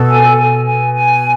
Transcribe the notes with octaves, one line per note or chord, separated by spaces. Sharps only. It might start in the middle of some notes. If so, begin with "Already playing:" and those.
Already playing: B2 A4
G#5
G#5
G#5
G#5